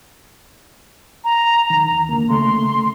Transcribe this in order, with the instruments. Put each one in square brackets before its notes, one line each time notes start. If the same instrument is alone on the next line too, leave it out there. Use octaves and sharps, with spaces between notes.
[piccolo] A#5
[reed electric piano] D#2 D#3
C#2 D3 A#3
[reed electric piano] C#3 A3 [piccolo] C6